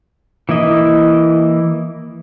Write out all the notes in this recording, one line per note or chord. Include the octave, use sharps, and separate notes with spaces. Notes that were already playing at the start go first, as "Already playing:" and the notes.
E3 A#3 E4 D#5